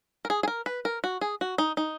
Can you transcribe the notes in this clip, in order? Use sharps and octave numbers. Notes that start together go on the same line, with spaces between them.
A#4
G#4
G#4
A#4
B4
A#4
F#4
G#4
F#4
D#4
D#4